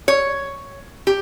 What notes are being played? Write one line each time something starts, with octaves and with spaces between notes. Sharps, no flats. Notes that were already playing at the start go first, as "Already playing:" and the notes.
C#5
G4